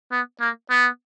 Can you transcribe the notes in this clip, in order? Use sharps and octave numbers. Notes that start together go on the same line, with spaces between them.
B3
A#3
B3